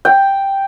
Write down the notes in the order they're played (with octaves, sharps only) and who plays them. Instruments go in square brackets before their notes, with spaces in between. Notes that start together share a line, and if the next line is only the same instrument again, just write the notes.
[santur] G5